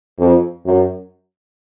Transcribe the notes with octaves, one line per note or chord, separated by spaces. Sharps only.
F2
F#2